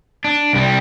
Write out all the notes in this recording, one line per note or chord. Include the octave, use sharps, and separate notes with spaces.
D4
C2 G3